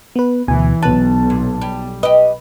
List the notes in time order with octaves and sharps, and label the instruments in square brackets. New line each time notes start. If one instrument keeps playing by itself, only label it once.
[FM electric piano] B3 B4
[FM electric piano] D2 B2 G#5 [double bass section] E3
[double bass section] B1 [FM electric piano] B3 A5 [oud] B4
[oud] A#2
G3
[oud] G4 D#5 [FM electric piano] B4